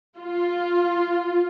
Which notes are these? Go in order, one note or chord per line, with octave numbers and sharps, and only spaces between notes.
F4